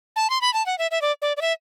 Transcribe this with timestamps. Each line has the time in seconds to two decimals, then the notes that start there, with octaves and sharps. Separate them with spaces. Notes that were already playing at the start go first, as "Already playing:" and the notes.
0.16 A5
0.30 C6
0.41 B5
0.53 A5
0.66 F#5
0.78 E5
0.91 E5
1.02 D5
1.22 D5
1.37 D5
1.41 E5